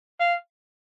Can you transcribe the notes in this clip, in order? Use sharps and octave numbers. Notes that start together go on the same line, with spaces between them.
F5